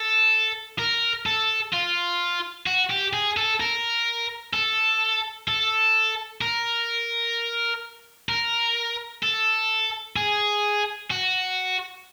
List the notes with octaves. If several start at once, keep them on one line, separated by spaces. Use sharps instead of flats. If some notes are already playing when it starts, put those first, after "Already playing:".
Already playing: A4
A#4
A4
F4
F#4
G4
G#4
A4
A#4
A4
A4
A#4
A#4
A4
G#4
F#4